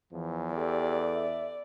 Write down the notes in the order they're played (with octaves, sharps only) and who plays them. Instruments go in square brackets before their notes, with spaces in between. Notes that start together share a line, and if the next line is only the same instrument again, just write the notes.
[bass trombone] E2 [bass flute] E3 [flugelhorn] F3
[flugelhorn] G4 [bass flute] A4 [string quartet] D5
[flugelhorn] E5